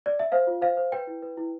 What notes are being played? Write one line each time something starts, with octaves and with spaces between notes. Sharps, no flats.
D5
E5
C5 F5
F4
C5 F5
C5
B4 G5
E4
B4
E4